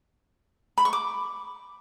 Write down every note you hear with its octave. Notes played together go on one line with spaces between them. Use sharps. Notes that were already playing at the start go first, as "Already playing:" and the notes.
B5
C#6
D6